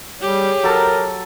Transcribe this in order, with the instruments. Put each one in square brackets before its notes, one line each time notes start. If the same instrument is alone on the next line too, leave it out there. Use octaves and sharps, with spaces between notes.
[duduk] G3 [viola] G4 G#4 [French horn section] C#5
[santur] F#3 A4 A5 [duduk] A#4